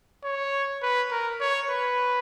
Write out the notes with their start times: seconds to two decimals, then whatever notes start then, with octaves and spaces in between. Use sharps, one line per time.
0.24 C#5
0.82 B4
1.11 A#4
1.41 C#5
1.69 B4